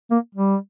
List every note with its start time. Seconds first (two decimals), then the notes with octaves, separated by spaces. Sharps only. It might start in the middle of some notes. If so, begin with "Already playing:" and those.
0.11 A#3
0.35 G3